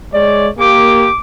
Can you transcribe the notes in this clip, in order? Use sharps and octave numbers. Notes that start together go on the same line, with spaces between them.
G#3 C#5 D5
A#3 G4 D6